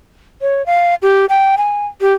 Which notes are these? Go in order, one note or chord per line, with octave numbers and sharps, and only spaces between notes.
C#5
F5
G4
G5
G#5
G4